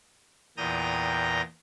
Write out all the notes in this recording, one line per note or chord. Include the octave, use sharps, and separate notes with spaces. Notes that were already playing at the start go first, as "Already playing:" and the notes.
E2 A#2 G5 A#5 D#6 A#6